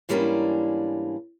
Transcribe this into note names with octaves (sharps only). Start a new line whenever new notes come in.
G#2 E3 G3 A#3 C#4 D4